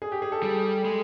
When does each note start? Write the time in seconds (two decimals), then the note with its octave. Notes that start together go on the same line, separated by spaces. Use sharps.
0.02 G#4
0.12 G4
0.22 G#4
0.32 A4
0.43 G3 G#4
0.85 G#3